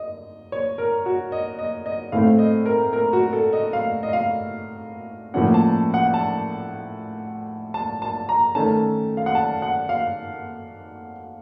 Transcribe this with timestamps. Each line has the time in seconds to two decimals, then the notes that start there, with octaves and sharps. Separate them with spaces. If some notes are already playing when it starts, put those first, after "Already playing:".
Already playing: D#5
0.52 C#5
0.78 A#4
1.06 F#4
1.32 D#5
1.59 D#5
1.86 D#5
2.12 A2 A3 C4 F5
2.39 D#5
2.66 A#4
2.93 A#4
3.13 F#4
3.33 A4
3.53 D#5
3.73 F5
4.03 D#5
4.13 F5
5.34 A2 F3 A#3 C#4 F#5
5.54 A5
5.94 F#5
6.14 A5
7.74 A5
8.02 A5
8.29 A#5
8.55 D#3 A3 C#4 A5
9.17 F5
9.26 F#5
9.35 A5
9.62 F#5
9.89 F5